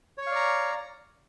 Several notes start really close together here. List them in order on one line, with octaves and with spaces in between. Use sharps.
C#5 C#6 F5 D5 A#5